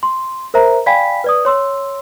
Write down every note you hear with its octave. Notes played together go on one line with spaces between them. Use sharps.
C6
A#4 C5 E5 A#5
D5 F5 G5 G#5 B5 B6
B4 D5 D#6
C#5 C6 E6